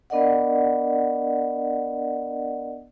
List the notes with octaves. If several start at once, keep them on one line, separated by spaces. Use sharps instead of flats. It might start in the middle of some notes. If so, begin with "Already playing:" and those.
B3 D4 A#4 D5 D#5 F#5